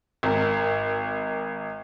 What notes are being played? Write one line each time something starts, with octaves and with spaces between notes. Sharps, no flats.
G#1 A#4